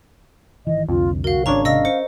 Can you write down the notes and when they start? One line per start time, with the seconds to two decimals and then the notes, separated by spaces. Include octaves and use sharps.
0.67 G#1 D#3 E3 D#5
0.88 C2 F2 D3 F4
1.24 F#4 A#4 F5
1.46 G#1 C#3 D4 C#5 A#5 C#6
1.65 C3 D#5 F5 E6 A#6
1.85 C#4 C5 C#7